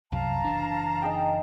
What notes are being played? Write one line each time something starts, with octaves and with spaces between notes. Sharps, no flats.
C2 F#2 C3 F5 A5 A#5
F#1 E3 D4
D#4 G#4 G5